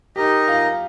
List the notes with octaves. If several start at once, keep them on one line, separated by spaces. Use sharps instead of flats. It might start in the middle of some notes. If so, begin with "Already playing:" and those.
D#4 G4 A#4 D#5
F4